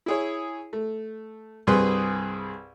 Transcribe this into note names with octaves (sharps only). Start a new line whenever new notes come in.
E4 G#4 C#5
A3
C2 G2 C4 G#4 B4 C6